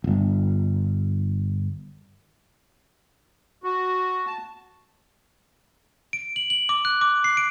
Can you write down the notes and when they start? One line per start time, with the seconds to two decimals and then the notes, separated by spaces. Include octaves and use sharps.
0.04 D1 G1
3.64 F#4
4.27 A5
6.13 D7
6.36 F#7
6.50 F#7
6.69 D6
6.85 F#6
7.01 D6
7.24 C7
7.37 D7